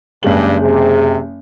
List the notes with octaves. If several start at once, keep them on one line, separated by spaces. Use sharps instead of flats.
F#1 G2 G#3 F#7
C3 G#4